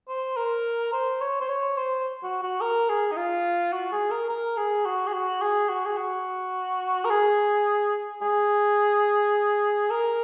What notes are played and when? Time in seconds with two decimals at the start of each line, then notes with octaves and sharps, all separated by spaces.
0.09 C5
0.37 A#4
0.93 C5
1.21 C#5
1.41 C5
1.49 C#5
1.77 C5
2.23 F#4
2.43 F#4
2.61 A#4
2.89 G#4
3.12 D#4
3.17 F4
3.73 F#4
3.92 G#4
4.11 A#4
4.30 A#4
4.57 G#4
4.86 F#4
5.07 G#4
5.13 F#4
5.42 G#4
5.69 F#4
5.86 G#4
5.97 F#4
7.05 A#4
7.10 G#4
8.22 G#4
9.90 A#4